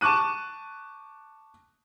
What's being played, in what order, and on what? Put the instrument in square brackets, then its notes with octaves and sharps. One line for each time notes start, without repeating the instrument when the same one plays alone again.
[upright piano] A5 C#6 D6 F#6 D#7